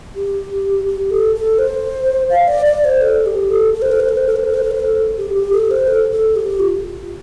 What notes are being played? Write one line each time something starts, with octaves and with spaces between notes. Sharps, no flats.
G4
G4
A4
A4
C5
F5
D5
D5
C5
A4
G4
A4
A4
C5
A4
C5
A4
C5
A4
C5
A4
C5
A4
C5
A4
G4
G4
A4
C5
A4
A4
G4
F4